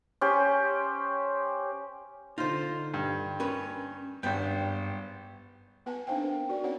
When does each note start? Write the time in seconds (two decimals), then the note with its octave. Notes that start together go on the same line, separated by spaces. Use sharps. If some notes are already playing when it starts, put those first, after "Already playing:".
0.21 C#4 G4 C5
2.38 D3 D#4 F4 C5
2.94 G2
3.40 C#4 A#4 B4
4.23 G#1 G2 B3 G5
5.86 B3 B4 F#5 G#5 A5
6.07 C4 D4 D#4 C5 F5 G5
6.22 A#4
6.49 B3 F#4 A#4 D5
6.64 C4 C#4 D#4 C#5 F#5